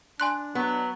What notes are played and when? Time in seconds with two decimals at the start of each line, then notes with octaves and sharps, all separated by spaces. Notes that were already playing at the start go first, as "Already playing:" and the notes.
0.20 D4 G#5 C6 F#6
0.55 F#3 B3